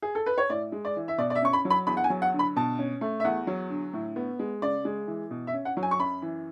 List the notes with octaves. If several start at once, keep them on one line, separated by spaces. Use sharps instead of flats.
G#4
A4
B4
C#5
A2 D5
G#3
D5
E3
E5
B2 D5
D5
E5
C#4 C#6
B5
F#3
B5
E2 B5
F#5
G#5
F#3
F#5
D3
B5
B2 A5
C#4
A3
E5
E2 F#5
F#3
D3
A2
B3
G#3
C#3 D5
G#3
E3
B2
E5
C#4
F#5
F#3
G#5
C#6
F#2 B5
E3